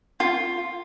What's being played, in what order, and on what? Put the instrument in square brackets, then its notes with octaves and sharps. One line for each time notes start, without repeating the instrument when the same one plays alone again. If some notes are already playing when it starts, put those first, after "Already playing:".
[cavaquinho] F4